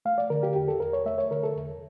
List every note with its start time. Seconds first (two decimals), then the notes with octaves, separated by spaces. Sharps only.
0.05 A3 F5
0.18 D5
0.30 D3 A#4
0.43 G4
0.56 E2 G4
0.68 A4
0.80 E2 A#4
0.93 C#5
1.05 A3 E5
1.18 C#5
1.31 D3 A#4
1.43 A4
1.56 E2